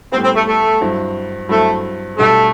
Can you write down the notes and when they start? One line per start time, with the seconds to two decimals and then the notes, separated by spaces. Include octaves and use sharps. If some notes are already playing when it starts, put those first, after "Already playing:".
0.12 A2 G3 B3 C4
0.24 C4
0.35 A3
0.47 A3
0.81 G2 F#3 C4 E4
1.49 G2 F#3 A3 C4 E4
2.18 B1 B2 G3 A3 D4